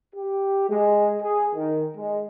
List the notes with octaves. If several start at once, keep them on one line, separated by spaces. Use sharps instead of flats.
G4
G#3
G#4
D#3
G#3